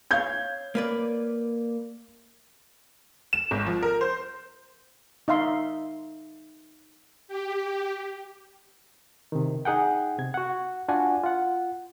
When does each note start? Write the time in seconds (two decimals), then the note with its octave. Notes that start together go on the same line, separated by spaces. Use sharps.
0.11 C#5 F5 G6 G#6
0.75 A#3 B4 D5
3.33 E7
3.51 G#1
3.66 F3
3.83 A#4
4.01 C5
5.28 D#4 E5 F5 C6
7.28 G4
9.32 C3 D#3
9.65 D#4 G#4 F#5 G5
10.19 C3 G#6
10.34 F#4 F#5
10.88 D4 F4 F#4 F#5 G#5
11.24 F4 F#5